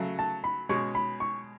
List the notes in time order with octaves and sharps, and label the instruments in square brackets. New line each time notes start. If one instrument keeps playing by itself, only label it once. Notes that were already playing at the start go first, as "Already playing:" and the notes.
Already playing: [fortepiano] C#3 F#3 A3
[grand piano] A5
B5
[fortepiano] B2 G#3 C#4 [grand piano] C#6
[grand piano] B5
C#6